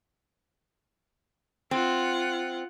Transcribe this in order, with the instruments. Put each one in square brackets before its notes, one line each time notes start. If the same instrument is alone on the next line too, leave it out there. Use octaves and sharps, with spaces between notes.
[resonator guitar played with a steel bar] C4 [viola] F4 F#5